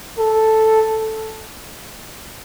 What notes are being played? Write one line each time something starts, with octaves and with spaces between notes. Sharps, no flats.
A4